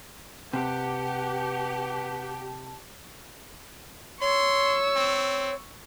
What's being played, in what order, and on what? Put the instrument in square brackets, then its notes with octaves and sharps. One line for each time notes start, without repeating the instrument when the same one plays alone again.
[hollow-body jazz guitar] C3 [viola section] G4 [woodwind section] B4 F#5 [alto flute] A5
[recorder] C#5 [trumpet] C6 [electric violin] C#6 E6
[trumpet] C4